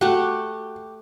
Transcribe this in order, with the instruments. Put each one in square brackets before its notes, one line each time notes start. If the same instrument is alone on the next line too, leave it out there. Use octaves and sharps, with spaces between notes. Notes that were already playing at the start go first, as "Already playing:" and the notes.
[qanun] A3 F#5 [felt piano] F#4 [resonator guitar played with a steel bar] G4